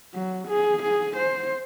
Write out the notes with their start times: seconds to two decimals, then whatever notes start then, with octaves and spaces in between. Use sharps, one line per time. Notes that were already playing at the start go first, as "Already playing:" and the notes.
0.14 F#3
0.48 G#4
0.83 G#4
1.17 C5